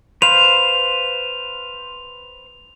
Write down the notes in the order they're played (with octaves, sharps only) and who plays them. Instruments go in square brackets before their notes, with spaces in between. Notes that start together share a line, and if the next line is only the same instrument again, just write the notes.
[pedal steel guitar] B4 C5 F5 [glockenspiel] F7